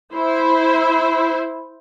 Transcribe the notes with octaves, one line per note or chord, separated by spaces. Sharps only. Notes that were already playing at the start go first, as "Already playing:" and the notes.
E4 C5